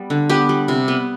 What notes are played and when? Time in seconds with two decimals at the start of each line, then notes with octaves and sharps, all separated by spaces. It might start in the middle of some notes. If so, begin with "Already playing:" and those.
Already playing: G3 B3
0.10 D3
0.29 B3 G4
0.49 G3
0.68 C3
0.88 B3